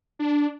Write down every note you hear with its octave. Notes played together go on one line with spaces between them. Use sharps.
D4